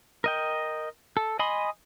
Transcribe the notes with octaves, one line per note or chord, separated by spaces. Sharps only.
A#4 D#5 G5
A4
D#5 G#5 B5 C6 D#6